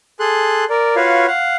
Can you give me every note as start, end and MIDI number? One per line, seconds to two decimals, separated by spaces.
0.20 0.65 68
0.20 0.65 69
0.20 0.65 84
0.20 0.65 90
0.70 0.96 70
0.70 0.96 74
0.96 1.27 65
0.96 1.27 66
0.96 1.27 71
0.96 1.27 73
0.96 1.27 77
1.27 1.57 77
1.27 1.57 78